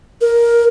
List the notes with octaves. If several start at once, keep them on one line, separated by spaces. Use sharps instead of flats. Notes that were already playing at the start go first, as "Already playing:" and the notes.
A#4